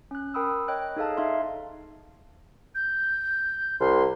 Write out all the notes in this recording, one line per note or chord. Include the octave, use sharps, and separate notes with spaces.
C#4 F#6
A#4 G5 B5 D#6 E6
C#5 D#5 G5 F#6
D#4 G#4 A4 D#5 F5 A5
D#4 E5 F5 C6
G6
C2 C6